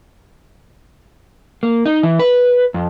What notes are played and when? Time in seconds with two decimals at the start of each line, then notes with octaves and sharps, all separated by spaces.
1.63 A#3
1.86 D#4
2.03 E3
2.19 B4
2.74 F2